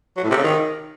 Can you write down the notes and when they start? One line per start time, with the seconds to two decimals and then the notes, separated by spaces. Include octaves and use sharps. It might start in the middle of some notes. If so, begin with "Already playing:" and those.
0.17 F#3
0.23 A2
0.30 C3
0.37 C#3
0.44 D#3